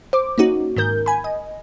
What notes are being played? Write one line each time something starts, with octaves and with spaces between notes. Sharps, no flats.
C5 D6
A#3 C#4 D#4 F#4
G#2 D#3 A#4 G6
G#5 B5
D#5